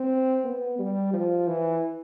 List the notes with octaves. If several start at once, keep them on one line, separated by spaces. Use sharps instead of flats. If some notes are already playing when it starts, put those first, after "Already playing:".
Already playing: C4
B3
G3
F3
E3